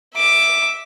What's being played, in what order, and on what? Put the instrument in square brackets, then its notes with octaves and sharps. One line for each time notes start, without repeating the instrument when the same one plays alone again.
[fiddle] E5 D6